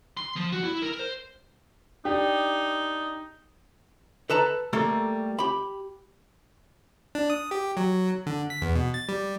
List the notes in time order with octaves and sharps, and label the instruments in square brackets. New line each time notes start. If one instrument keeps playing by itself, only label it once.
[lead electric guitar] C6
F3
F#4
E4
A#4
C5
[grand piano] D4 G4 [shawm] D#4
[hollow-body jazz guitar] A4 B4 A5 A#5
G3 A3 A#3 A4
G4 B5
[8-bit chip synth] D4
D#6
G4
F#3
D3
B6
E2
B2
A6
G3